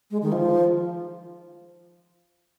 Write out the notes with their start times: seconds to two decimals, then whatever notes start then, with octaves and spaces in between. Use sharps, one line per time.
0.11 G#3
0.22 D#3
0.32 F3